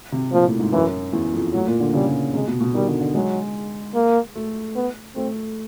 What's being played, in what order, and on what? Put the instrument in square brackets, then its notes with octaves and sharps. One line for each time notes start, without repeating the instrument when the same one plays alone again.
[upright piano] C3
[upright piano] A#2 [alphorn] F3
[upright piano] A2
G#2
[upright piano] F#2 [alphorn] E3
[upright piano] E2
F2
[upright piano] A2 [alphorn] F#3
[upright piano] A#2
D3
[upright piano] C#3 [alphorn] G3
[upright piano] C3 [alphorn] G#3
[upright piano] B2
B2
[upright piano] D#3 [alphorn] G3
[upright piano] D3
D3
[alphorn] F#3 [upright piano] G#3
[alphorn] A#3
[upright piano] A3
[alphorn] B3
[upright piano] A3 [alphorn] C4